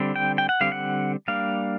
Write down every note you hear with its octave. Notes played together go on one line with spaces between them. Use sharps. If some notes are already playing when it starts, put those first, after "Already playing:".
Already playing: D3 G3 C4
G5
G5
F#5
D3 G3 C4 F5
F#5
G3 A#3 D4 F5